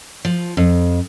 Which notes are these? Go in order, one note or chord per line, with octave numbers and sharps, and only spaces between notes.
F3
F2